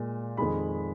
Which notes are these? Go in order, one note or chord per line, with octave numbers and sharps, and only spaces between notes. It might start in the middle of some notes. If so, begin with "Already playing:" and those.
Already playing: A#2 G#3
F2 D#3 G#3 B5